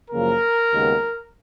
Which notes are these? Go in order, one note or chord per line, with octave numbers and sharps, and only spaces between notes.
F#2 C#3 F3 A#3 A#4
D#2 C#3 G#3 B3